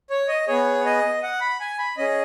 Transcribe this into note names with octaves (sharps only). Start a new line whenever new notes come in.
C#5
D#5
B3 G#4 C#5
D#5
F#5
B5
G#5
B5
C#4 G#4 D#5